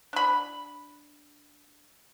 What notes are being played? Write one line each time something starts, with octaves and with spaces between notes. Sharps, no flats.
D4 B5